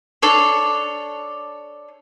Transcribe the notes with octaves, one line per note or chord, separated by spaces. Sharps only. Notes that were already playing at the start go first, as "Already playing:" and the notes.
D4 A4 C#5